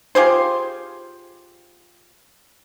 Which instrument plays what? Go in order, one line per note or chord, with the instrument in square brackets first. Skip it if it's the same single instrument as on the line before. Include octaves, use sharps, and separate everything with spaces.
[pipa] F4 G4 G#4 C5